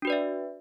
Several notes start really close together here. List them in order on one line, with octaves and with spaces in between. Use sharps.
D4 F#4 B4 D5 E5